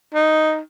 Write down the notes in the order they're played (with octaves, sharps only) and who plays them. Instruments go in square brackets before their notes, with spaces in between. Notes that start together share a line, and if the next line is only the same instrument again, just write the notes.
[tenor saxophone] D#4